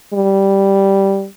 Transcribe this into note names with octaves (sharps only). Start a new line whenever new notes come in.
G3